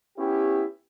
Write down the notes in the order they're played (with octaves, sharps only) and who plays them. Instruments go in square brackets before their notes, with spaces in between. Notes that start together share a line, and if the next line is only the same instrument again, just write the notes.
[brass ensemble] B3 C#4 E4 G4